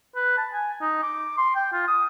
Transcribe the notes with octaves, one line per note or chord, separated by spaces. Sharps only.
B4
A5
G#5
D#4
D6
C6
G5
F4
D#6